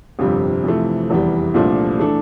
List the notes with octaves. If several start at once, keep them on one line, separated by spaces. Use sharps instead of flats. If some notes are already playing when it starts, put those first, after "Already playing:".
G1 F2 C3 G3
F2 C3 E3 A3
F1 E2 E3 G3
C2 A#2 F3 A3 D4
E3 A3 D4 A4